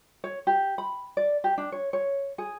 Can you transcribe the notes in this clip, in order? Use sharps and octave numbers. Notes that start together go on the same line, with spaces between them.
C#5
G4
B5
D5
G4
D4
C#5
C#5
G#4